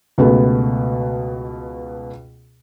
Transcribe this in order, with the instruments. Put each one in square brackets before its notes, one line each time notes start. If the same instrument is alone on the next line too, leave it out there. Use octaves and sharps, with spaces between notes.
[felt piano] C#2 B2 A3 B3